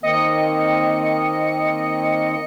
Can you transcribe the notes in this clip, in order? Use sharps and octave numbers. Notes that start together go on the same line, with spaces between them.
D#3 A#3 C4 D#5 C#7